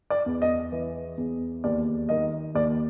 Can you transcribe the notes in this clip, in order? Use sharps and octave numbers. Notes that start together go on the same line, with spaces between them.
D5
E2
D#5
E3
E2
D#2 D5
D#3 D#5
D#2 D5